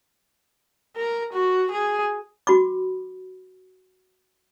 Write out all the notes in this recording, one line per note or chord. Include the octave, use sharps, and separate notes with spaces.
A#4
F#4
G#4
F#4 B5 D6